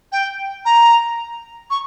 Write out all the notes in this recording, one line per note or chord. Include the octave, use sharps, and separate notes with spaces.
G5
A#5
C#6